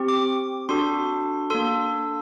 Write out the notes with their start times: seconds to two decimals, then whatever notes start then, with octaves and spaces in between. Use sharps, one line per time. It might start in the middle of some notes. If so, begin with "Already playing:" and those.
Already playing: C4 G4
0.08 D6
0.69 D4 F#4 A4 C6
1.50 A#3 D4 A4 C6